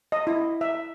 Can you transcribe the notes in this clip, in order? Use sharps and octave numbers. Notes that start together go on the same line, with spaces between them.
D#5
E4
E5